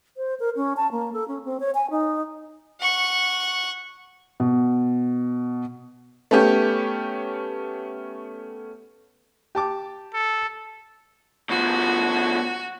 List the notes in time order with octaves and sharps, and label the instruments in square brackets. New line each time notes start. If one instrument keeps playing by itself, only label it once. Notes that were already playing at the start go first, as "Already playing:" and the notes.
[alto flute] C5
A#4
C#4
A5
A#3
A4
C#4
C4
C#5
G#5
D#4
[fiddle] F#5 C#6
[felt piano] B2
[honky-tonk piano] A3 B3 C#4 G4
[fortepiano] G4 A5 D6
[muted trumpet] A4
[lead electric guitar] B2 F3 [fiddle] F#4